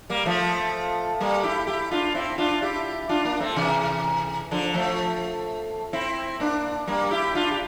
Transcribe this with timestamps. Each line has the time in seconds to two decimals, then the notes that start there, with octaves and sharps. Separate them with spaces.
0.10 G3 A#3
0.25 F3 A3
1.20 G3 A#3
1.43 E4 G4
1.67 E4 G4
1.91 D4 F4
2.15 C4 E4
2.38 D4 F4
2.62 E4 G4
3.09 D4 F4
3.24 A#3 D4
3.40 A3 C4
3.56 C3 E3
4.51 D3 F3
4.74 F3 A3
5.93 C4 E4
6.40 A#3 D4
6.87 G3 A#3
7.11 E4 G4
7.35 D4 F4
7.51 G4